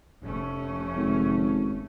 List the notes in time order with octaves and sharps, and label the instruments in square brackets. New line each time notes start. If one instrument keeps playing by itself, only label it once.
[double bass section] F1 A3 C#4
[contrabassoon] G#1